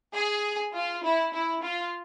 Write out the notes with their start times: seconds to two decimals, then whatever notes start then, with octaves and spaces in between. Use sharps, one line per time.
0.14 G#4
0.73 F4
1.03 E4
1.32 E4
1.62 F4